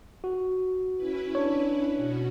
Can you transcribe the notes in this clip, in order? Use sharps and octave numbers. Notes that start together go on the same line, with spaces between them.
F#4
C#4 E4 B4
D4 C#5
B2 C#4 F#4